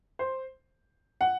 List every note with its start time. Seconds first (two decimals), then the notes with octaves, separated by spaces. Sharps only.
0.19 C5
1.21 F#5